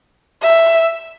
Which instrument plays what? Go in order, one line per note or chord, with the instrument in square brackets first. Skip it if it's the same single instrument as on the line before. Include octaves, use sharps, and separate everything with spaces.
[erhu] E5